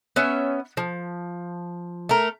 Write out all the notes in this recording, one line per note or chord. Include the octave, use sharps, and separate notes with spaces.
B3 C#4 E5
F3
A3 A#4